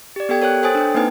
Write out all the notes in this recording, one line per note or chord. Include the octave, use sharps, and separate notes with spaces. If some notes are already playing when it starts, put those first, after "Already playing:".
G4 D5
B3 G4 A4 G5 G#6
A#4 C#5 G5 F#6
A4 C5 C#5 G#5 D#6 A6
D4 G5
A#3 C4 D#4 B4 G#5